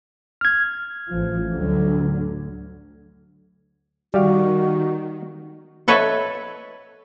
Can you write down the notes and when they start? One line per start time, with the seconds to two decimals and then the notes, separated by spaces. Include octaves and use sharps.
0.41 F6 G#6
1.09 A1 F3
1.53 D2 D3 F#3
4.14 D#3 G3 F#4 G4 F5
5.88 A4 B4 C#5 D#5 E5